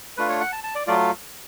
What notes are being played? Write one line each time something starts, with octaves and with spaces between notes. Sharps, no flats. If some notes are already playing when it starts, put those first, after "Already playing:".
A3 D4 F4 B4
C#5
F#5
A5
A5
D5
F#3 A3 F4 D5